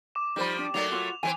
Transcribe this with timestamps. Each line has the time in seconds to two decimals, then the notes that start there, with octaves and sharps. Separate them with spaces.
0.15 D6 E7
0.36 F3 G3 D#4 C5 B5
0.59 D4
0.74 F#3 A3 A#3 D#4 D5 F7
0.92 F4 F#4 C#5
1.23 E3 G3 C4 G#5